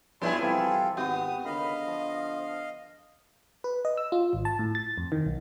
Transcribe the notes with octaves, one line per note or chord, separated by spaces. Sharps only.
B1 G2 F3 E4 G#4 A5 C6
C2 E3 C4 F4 G4 A4
G#1 B3 F#4 G4 D#6
C#2 D3 D#3 D#5 F5 B5
F3
B4
D#5
E6
F4
G#1
A5
A2
A6
F2
D#3
B1